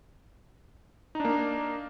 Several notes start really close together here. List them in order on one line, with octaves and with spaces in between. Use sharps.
D#4 D4 A#3